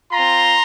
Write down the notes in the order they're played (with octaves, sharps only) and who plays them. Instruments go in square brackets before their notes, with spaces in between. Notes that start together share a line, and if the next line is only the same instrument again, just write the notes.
[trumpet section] C4 F4 A#5 C6